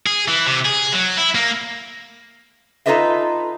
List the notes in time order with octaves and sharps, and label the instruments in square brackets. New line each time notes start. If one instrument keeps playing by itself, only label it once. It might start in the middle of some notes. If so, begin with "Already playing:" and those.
[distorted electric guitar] G#4
E3
C3
G#4
F#3
E4
A#3
[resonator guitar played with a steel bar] D#4 F4 A4 B4 D#5 E5